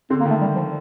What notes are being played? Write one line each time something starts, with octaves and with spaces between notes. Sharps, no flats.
D3 C4
A#3
D#3
A3
G3
F3